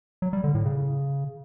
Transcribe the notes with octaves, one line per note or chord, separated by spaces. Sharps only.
F#3
G3
D3
A2
C#3